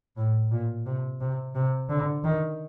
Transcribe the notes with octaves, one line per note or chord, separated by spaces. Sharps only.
A2
A#2
C3
C3
C3
D3
D#3